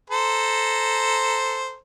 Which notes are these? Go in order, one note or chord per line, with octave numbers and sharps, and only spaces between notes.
A4 C5 A#5